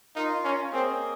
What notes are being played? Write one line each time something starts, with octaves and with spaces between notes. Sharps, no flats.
D#4 F4 A#4 F5
C#4
A#3 C4 C#4 G#4 D#5